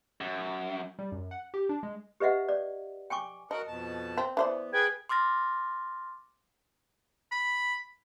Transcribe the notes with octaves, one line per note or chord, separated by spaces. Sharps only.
F#2
G3
F#2
F#5
G4
D4
G#3
G4 B4 D#5 E5 F#5
D5
G5 G#5 C#6 D6
F#4 A#4 D#5 F#5
F2 B2 A5
C4
E3 B3 C5 D5
G#4 B4 G5 G#6
C6 D6 F6 A6 A#6
B5